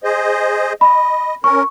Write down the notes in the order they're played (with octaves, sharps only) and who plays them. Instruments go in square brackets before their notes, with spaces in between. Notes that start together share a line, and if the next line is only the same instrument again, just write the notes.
[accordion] G#4 C5 D#5
[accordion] D#5 [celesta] B5
[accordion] C#4 A#4 [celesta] C#6